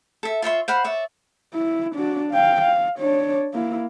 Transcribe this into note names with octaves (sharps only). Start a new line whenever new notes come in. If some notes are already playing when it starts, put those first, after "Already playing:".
A4 E5
F4 C#5 E5 C6
C5 F5 F#5 B5
C#5 D5 E5
E4
D4 F#4
F5 G5
F5
D4 C#5
A#3 E4